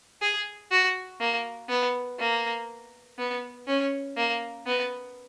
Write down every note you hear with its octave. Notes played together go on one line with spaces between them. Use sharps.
G#4
F#4
A#3
B3
A#3
B3
C#4
A#3
B3